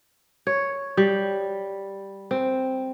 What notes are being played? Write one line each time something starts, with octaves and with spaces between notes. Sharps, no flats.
C#5
G3
C4